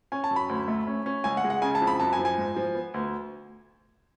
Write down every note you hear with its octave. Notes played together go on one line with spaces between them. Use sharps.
C#4 G#5
A5
F#2
B5
D2
A3
C#4
C#4
C#2 G#5
F#5
G#3
F#5
C#3 G#5
A5
F2
B5
F#2 A5
G#5
F3
G#5
G#2
F3
B3
D2